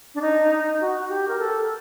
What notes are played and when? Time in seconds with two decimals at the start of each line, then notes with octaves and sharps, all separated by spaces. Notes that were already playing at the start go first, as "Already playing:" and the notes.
0.15 D4
0.22 D#4
0.81 F#4
1.09 G4
1.28 A#4
1.39 A4